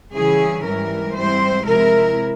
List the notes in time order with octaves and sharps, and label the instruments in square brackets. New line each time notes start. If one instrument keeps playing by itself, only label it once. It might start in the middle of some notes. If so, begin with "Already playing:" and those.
[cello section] C#3 E3 G3 C#4 E4 G#4
G#2 E3 G3 A#4
G#2 G3 C4 E4 C5
C3 F3 G#3 E4 A#4